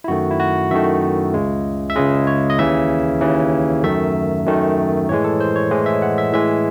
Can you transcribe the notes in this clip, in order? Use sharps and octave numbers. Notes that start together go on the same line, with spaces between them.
E4
F#2 D#3 A3 F#4
E4
F#4
F#2 D#3 A3 E5
C#2 C#3 G#3
E5
C#2 C#3 G#3 D#5
C#5
D#5
D#2 C#3 E3 E5
D#2 C#3 E3
F#2 D#3 A3 E5
F#2 D#3 A3
A2 E3 G#3 C#5
A4
C5
C#5
A2 E3 G#3 D#5
E5
F#5
E5
A2 E3 G#3 E5